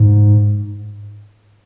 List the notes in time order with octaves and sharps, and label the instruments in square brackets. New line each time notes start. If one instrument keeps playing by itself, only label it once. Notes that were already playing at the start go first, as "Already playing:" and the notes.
Already playing: [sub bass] G#2